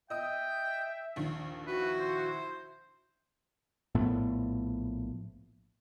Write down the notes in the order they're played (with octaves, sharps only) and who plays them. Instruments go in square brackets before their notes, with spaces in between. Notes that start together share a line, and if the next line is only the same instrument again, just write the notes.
[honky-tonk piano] D#5 D#6 [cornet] E5 [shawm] G5
[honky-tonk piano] A#1 D#2
[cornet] E4 [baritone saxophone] F#4 [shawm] B4
[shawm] C5
[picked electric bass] A#1 A2 A3 B3